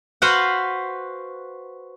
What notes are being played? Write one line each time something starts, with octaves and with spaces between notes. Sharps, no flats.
F#4 B4 C5 F5 F#5